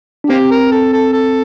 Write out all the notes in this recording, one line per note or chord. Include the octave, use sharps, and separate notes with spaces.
D4
A#3 C4 G4
A#4
A4
A4
A4